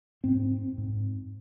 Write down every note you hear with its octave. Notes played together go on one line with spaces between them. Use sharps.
G#2 C4
G#2